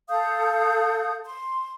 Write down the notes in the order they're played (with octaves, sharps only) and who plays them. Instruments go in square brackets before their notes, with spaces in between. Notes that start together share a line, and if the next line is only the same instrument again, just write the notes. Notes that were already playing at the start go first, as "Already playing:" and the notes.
[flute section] A4 F5 D#6 G6
C6